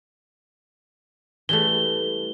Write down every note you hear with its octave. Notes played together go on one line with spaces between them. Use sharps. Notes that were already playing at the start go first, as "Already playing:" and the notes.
E3 G3 A3 G7